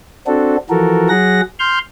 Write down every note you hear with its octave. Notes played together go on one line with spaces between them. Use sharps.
C4 D4 F#4 A4
E3 F3 F#4 A4 A#4
F#3 G#4 F#5 A#6
C6 F6 G6